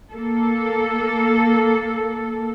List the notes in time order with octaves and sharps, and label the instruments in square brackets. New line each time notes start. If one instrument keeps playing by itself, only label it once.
[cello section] A#3 A4